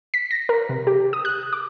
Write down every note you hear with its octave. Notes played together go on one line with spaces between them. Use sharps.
B6
A#6
A#4
C3
G4
D#6
F#6
D6